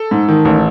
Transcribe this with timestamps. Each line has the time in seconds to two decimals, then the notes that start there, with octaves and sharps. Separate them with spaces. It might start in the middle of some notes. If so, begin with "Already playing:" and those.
Already playing: A4
0.11 G#2
0.28 D#3
0.45 A1